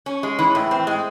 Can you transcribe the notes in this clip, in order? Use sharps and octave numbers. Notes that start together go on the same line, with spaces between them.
C#4
G#3
E3
A2
C4
G#3